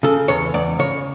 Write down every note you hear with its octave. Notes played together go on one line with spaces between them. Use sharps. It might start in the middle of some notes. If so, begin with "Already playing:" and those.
C#3 A4
E2 C#5
E2 D5
C#3 C#5